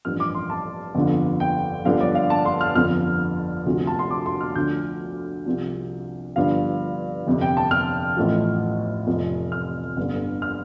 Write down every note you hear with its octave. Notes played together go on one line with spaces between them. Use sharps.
A1 G2 F3 F6
D6
C6
A5
G1 F2 D3 F3
G5
G1 G2 D3 F3 F5
D5
F5
A5
C6
F6
G1 F2 F3 F6
D2 C3 F3
A5
C6
D6
C6
F6
D2 D3 F3 G6
C2 C3 F3
G1 G2 F3 F5
G1 F2 C3
G5
A5
F6
A1 A2 F3
F1 F2 F3
F6
G1 G2 D3
F6